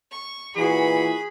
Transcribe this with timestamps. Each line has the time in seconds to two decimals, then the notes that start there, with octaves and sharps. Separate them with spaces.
0.11 C#6
0.56 A#2 E3 F#4 G#4 B5